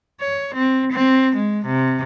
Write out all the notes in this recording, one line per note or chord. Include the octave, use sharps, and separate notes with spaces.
C#5
C4
C4
G#3
C3